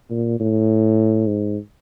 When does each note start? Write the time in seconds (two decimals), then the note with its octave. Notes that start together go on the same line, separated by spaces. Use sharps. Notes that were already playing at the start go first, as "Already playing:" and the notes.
0.11 A#2
0.40 A2
1.27 G#2